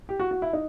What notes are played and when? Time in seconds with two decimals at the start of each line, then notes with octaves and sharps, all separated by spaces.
0.09 G4
0.20 F#4
0.31 F#4
0.42 E4
0.53 D#4